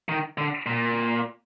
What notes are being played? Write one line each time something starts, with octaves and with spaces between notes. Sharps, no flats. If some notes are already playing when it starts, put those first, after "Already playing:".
D#3
D3
A#2